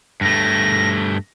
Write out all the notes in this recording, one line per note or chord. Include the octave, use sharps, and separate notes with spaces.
G2 A3 A#6